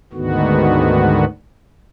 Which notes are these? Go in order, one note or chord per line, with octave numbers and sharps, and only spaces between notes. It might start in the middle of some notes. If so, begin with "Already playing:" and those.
D2 G#2 D3 D#3 B3 F#4